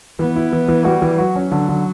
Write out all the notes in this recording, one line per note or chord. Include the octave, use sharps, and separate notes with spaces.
E3 B3
E4
E3
E3
G3 F#4
E3
F#3 F#4
C#4
D3
D3